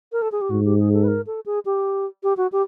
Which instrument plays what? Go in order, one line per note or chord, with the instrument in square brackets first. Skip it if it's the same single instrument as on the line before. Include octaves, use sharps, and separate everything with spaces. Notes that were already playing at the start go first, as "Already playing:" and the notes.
[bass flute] A#4
A4
G#4
G4
[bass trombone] G#2 [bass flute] F#4
[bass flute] G4
G#4
A4
B4
A#4
A4
G#4
G4
G4
F#4
G4